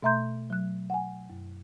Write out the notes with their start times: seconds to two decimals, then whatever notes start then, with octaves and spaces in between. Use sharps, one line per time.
0.03 B2 A3 E5 A#5 C6 G6
0.50 F#3 F#6
0.90 F#5 G#5
1.30 F#2